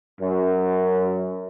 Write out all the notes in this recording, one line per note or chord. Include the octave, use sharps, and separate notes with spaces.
F#2